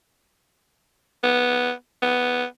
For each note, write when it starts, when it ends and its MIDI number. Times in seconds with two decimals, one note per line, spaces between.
1.23 1.72 59
2.02 2.45 59